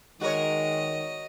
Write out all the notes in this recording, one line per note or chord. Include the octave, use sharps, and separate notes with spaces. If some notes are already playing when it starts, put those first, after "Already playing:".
D#3 G#3 F#4 A#4 C#5 D#5